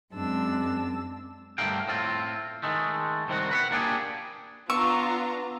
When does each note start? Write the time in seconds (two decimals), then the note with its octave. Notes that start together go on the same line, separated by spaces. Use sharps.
0.13 F#2 G#3 C4 D4 A5 E6
1.58 G2 D3 A3 A#4 F5 G5
1.88 A2 C4 F4
2.63 D#3 G#3 A3
3.28 C2 D#3 C4 F#4
3.51 B4 E5 F#5
3.71 A#3 D4 G4 G#4
4.70 B3 D4 F4 A#5 C#6 E6